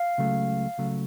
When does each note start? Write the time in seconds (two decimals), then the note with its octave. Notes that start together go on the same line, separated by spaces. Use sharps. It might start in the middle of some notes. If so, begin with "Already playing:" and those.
Already playing: F5
0.18 C#2 C#3 F#3 A3
0.78 C#2 C#3 F#3 A3